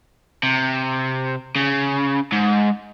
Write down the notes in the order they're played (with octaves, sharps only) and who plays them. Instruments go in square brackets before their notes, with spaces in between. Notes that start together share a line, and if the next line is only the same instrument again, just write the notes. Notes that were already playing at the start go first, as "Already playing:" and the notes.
[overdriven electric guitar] C3
C#3
G#2